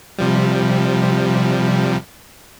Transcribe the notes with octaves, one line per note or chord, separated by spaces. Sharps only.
C3 F3 G3